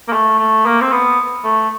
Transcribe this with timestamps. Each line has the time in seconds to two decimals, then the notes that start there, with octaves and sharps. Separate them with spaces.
0.08 A#3
0.13 A3
0.38 A3
0.66 A#3
0.81 C4
0.92 B3
1.44 A3